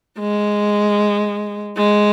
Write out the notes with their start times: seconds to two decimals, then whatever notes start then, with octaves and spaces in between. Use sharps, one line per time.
0.19 G#3
1.77 G#3